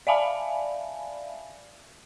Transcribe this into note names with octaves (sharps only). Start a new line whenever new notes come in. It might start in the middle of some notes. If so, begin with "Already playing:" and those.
D5 E5 F5 G#5 A5 B5